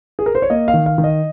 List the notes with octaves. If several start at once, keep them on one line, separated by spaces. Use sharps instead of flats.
G#4
A#4
C5
C#5
A#3 D#5
F5
D#3
F5
D#3
D#5